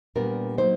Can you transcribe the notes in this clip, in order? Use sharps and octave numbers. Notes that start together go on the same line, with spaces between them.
A#2 G3 B3 D4 A#4
F#3 A#3 D#4 C5